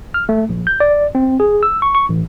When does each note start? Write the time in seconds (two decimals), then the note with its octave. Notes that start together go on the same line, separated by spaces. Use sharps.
0.14 F6
0.29 A3
0.49 A#1
0.67 G6
0.80 D5
1.15 C4
1.40 G#4
1.63 E6
1.82 C#6
1.95 C#6
2.09 A1